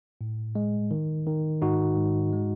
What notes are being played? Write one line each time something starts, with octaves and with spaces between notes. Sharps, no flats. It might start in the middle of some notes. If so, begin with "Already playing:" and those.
A2
G#3
D#3
D#3
G#2 D#4 F#4
G#2
G#3